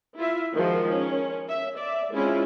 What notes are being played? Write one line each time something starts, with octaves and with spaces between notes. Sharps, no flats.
E4 F4 E5
D#3 F3 G#3 F#4 C5
C#4 A#4
E5
D5 E5
G#3 C4 C#4 E4 F4